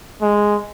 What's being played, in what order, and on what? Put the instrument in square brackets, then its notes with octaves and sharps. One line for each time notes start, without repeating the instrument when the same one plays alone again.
[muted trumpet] G#3